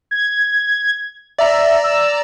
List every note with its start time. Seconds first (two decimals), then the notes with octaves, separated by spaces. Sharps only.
0.11 G#6
1.38 D5 E5 A#5
1.84 E6